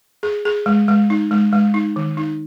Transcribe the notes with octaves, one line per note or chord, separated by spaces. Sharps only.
G#4
G#4
G#3
G#3
D#4
G#3
G#3
D#4
D#3
D#4